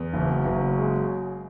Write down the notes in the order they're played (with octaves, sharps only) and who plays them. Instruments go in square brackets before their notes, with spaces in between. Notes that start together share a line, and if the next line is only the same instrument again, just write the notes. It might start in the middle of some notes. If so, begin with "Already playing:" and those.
Already playing: [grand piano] E2
[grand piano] F#1 [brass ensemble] F#3
[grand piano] F#1
G#3